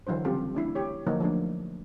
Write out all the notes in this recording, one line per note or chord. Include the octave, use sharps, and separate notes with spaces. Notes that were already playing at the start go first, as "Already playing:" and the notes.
D3 E3 F#3 D4 C5
C#3 G3 C4 F4 G4 A4
A3 D4 E4
G4 C#5
D3 F3 F#3 A#3 D#4 C#5
F3 A3 D4